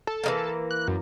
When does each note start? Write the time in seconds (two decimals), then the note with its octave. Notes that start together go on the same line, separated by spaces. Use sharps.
0.07 A4
0.24 E3 G#3 A#3
0.71 F#6
0.88 F#2